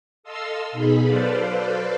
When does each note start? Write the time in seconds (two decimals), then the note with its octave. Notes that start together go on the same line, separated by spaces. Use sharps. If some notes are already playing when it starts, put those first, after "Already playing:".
0.23 A4 D#5 F5 C6 E6
0.72 B2 D#4 G#4 B5
1.04 F#3 A4 B4 C5 D5 F5